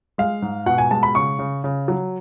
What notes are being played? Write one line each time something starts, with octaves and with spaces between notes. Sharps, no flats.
G#3 F5
G#2
B2 F#5
G#5
G#3 A5
B5
C#3 C#6
C#3
C#3
F#3